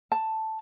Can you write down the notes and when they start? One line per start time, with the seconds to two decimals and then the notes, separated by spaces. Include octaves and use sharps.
0.12 A5